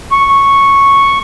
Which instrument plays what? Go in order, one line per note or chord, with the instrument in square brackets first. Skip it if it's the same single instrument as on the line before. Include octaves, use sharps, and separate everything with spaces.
[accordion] C#6